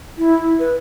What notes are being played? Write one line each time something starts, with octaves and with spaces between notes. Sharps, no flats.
E4
B4